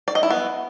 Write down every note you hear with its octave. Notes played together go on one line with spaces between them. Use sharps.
D5
D#5
E4
B3